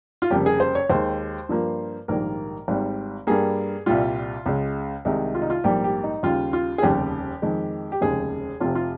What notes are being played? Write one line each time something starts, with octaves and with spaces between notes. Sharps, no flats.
F4
F1 F2 C#3 G3 A#3 G4
G#4
C5
C#5
D#2 D#3 G#3 C5
G2 F3 A#3
A#1 G#2 D#3 G3 A#3 A#4
G#1 G#2 G3
G2 G3 A#3 G#4
C2 A#2 G3 F4
C#2 C#3 G#3
C2 C3 D#3 G#3 D#4
F4
D#4
F4
A#1 G#2 G3 A#3 G4
G4
D#4
D#2 C#3 G3 F4
F4
G#4
F1 D#2 C#3 G3 G4
F2 D#3 G#3
G4
F1 D#2 C#3 G#3 G#4
F1 F2 C3 F4
F4